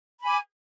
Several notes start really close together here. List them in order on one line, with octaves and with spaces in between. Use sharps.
B5 G#5 D6